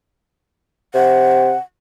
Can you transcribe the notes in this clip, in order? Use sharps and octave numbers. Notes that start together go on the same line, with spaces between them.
C3 F#5